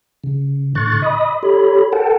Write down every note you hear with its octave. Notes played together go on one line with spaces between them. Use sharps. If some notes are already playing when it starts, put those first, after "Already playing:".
C#3
A2 D3 C#6 F#6 A6
D#5 B5 D#6
G4 A4 C#5 B5
A4 A#4 F#5 G5 A5